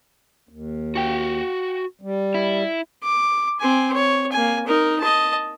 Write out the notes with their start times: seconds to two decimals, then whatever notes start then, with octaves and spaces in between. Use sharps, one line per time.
0.49 D#2
0.95 F#4 G5
2.02 G3
2.35 E4
3.03 D6
3.60 C4 G#5
3.94 C#5
4.32 A#3 G#5
4.66 D#4 A#4
5.01 D#5 A5